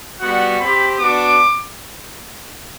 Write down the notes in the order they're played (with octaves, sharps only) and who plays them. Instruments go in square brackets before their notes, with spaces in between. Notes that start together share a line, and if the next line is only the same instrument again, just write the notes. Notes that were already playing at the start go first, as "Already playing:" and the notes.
[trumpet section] G3 B3 F#4 F#5
C4 G4 B5
B3 D4 F#4 D6